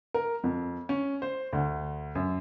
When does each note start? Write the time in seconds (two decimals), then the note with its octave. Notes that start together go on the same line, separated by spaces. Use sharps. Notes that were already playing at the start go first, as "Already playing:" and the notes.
0.14 A#4
0.44 F2
0.89 C#4
1.22 C5
1.53 D2
2.15 F#2